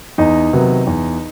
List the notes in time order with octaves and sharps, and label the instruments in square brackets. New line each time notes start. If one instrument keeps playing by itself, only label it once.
[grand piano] E2 D#4
C3 D#3 F#3 B3
E2